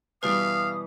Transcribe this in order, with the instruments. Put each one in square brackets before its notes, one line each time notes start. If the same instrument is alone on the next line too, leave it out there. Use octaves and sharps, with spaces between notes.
[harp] B2 E3 G3 [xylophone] B4 [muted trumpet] F5 [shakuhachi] D#6